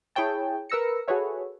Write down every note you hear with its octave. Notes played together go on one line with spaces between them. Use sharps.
E4 G#4 C#5 G5 A5
A#4 B4 E6 A#6 C#7
F#4 G#4 A4 B4 C#5 E5